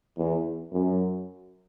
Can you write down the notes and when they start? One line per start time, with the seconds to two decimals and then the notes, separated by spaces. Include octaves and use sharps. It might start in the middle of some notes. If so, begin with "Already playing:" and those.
0.18 E2
0.72 F#2